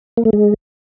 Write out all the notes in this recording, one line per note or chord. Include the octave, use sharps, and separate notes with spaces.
A#3
A3
G#3